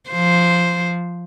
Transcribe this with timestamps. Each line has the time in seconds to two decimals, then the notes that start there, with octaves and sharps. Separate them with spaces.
0.10 F3 C5